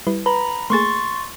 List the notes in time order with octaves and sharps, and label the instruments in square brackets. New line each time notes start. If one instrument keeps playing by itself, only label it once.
[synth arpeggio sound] G3 E4 B4
[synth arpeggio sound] B4 [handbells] A#5 B5
[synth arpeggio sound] A3 A#3 G#4 [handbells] C6 C#6 A6